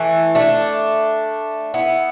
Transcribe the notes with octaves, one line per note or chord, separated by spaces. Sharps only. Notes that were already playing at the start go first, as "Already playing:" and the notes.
Already playing: E3 A3
A3 D4
B3 E4